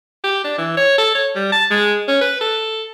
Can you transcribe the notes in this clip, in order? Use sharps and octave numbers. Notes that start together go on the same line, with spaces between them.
G4
D4
E3
C#5
A4
C#5
G3
A5
G#3
C#4
B4
A4